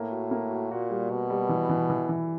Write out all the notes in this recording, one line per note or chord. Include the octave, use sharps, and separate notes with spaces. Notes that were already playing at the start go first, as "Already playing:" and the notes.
Already playing: A2 A#3
F#4
A#3
F#4
A#2 F#4
G3
B2 F#4
G3
E3
E3
E3
E3